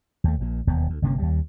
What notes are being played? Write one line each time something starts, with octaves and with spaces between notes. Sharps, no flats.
D#2 A3
A#1 A#2
E1 D#2 B3
D2
G1 C3 A#3 C#4
D#2 G3